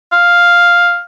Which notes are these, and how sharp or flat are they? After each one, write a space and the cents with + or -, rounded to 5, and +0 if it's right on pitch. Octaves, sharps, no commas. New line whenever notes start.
F5 +0